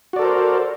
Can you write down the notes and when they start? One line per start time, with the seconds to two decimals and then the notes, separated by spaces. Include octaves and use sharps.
0.13 F#4
0.16 D5
0.19 A4
0.22 A#4
0.25 C5